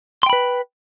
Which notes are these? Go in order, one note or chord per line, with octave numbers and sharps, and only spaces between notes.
B4 G5 B5 C6